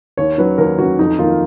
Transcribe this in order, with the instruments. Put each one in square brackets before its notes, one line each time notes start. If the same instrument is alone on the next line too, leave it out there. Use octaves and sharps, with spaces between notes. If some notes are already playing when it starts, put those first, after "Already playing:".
[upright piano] D#2 [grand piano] C#5
[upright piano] D#3 F#3 C#4 [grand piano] B4
[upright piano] D#2 [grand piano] A#4
[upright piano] D#3 F#3 C#4 [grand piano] F#4
[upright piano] F2 [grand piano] D#4
[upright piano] D#3 A#3 [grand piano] F4